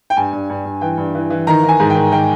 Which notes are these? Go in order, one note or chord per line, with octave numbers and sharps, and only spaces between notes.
G5
G2 G#5
G2
G2
G2
E3 G5
G2
E3
E3
D#3 A#5
D#3
G#5
G#2
G5
D#3
D#3 G5